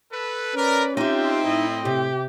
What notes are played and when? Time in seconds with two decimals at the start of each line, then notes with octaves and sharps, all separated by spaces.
0.12 A4 B4
0.55 C#4 A#4 B4 D5
0.97 C4 D#4 F4 G4 E5
1.45 A2 E4 D#5
1.85 C3 G4